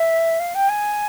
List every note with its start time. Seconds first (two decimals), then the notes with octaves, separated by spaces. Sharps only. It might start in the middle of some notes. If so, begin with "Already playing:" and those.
Already playing: E5
0.40 F5
0.55 G5
0.69 G#5